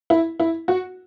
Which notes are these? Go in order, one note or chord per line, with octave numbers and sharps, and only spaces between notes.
E4
E4
F#4